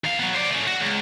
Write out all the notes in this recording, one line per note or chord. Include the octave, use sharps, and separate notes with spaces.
D#3 F5
F#3 B3
C5 D5
A3 C#4
F#4
C#2